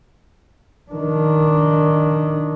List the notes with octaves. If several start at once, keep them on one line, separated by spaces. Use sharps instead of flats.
D#3 D4